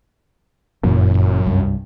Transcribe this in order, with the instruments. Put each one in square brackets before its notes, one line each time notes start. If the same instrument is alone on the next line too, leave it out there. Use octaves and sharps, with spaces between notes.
[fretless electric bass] G1 A#2 E3 [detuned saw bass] F#2
[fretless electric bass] C2 G2